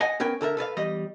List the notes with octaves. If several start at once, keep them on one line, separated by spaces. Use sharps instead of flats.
D#5 F#5 G#5
B3 C#4 A#4 G5 G#5
D3 A4 A#4 E5
A4 B4 D5 F5
E2 G3 D#5